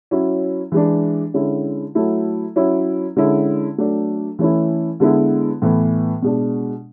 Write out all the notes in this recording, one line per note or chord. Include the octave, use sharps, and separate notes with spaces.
F#3 C#4 E4
E3 G#3 D4
D3 G#3 C#4 E4
F#3 A3 E4
F#3 C#4 E4
D3 G#3 C#4 E4
F#3 A3 D4
E3 A3 C#4 E4
D3 G#3 B3 E4
A2 E3 B3
B2 G#3 D4